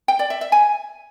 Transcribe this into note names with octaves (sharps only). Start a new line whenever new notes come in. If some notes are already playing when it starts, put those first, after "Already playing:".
G5
D5
E5
E5
G#5